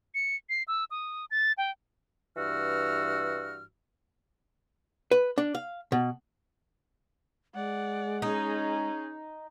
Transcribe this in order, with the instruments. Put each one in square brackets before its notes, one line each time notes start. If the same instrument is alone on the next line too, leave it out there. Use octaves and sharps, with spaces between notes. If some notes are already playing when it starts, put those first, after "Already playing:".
[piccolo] C#7
C7
E6
D#6
A6
G5
[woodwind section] G2 E3 F#4 E6 F6
[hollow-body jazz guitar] B4
D4
F5
B2
[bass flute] G#3 [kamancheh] D5 F#5
[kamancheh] C#4 G#4 [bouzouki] D#4